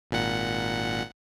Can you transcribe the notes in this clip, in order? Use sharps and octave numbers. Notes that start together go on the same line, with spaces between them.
G#1 A#2 F#5